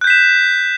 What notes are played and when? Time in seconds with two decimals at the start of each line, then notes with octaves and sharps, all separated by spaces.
0.01 F#6
0.04 G6
0.07 B6
0.10 E7